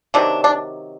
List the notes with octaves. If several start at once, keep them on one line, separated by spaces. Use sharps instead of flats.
C3 D#3 F#3 D4
D4